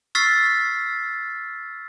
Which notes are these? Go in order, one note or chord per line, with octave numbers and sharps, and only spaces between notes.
C#6 E6 F6 A6 B6 C7